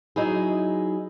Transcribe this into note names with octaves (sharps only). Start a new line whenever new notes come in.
F#3 D#4 E4 G#4